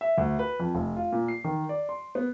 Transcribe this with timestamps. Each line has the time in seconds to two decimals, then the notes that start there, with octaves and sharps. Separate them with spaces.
0.01 E5
0.18 D2
0.39 B4
0.60 F2
0.75 F1
0.96 F4
1.12 A#2
1.28 C7
1.44 D#3
1.69 D5
1.89 C6
2.15 B3